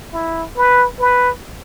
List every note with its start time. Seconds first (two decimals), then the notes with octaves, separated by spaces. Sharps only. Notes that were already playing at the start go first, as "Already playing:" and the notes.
0.13 E4
0.57 B4
1.00 B4